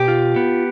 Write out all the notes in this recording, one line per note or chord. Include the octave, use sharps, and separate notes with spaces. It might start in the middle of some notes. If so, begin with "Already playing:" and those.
Already playing: B2 G4
F4
B3